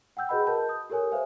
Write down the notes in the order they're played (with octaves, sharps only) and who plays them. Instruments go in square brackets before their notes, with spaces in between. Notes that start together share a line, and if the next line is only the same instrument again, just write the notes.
[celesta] F#5 G5 E6 G6
F#4 G#4 B4 D#5 F#5 B5
A#4 D#5 A5 G6
D#6
G4 A4 A#4 C#5 G#5
B4 C5 E5 F5 G#5